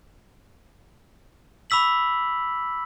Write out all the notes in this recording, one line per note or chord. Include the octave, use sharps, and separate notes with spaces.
B5 D6 E6 B6 F#7